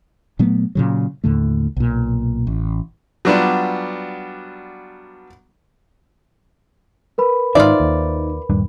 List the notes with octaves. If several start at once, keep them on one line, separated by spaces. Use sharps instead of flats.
A#2 F#3 A3 B3
A#2 C#3 F#3
D#2 A2 D3 A3
B1 A#2
A1
F#3 G3 B3 D4 F4
A#4 B4 B5
G#2 D#3 D#4 F4 C5 D5 E5
D#2
D#1 G2 D4